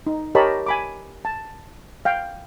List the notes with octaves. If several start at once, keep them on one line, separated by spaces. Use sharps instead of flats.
D#4
G4 A#4 C#5 D#5 A5 B5
G#5 B5 D6
A5
F5 G5